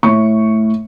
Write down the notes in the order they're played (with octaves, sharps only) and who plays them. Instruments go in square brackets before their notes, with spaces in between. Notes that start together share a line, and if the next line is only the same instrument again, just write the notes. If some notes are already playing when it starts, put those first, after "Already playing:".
[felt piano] A2 C#6